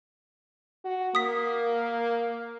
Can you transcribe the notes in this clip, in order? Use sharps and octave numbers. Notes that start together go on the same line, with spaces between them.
F#4
A#3 D#6 B6